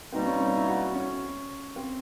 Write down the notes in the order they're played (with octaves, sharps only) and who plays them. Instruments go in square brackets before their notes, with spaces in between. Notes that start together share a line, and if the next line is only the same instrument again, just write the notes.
[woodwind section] B2 G3 A#3 D#4 [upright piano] C4
[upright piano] C#4
C#4
E4
F#4
C#4
C4